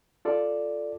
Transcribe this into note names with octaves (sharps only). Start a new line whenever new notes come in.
F4 A4 D5